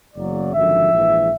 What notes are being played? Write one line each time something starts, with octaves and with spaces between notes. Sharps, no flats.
F#1 E2 C#3 F#3 A#3 D5
G#1 F#2 D3 F3 E5
A#1 G#2 E3